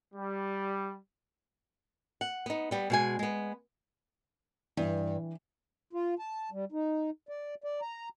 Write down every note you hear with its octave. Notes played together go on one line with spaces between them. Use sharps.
G3
F#5
B3 D#4
G3 B3
B2 G#3 G#5
G#3 B3
G2 E3
F4
A5
G3
D#4
D5
D5
A#5